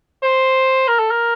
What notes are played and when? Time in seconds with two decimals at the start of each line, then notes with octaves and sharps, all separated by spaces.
0.23 C5
0.88 A#4
0.99 A4
1.11 A#4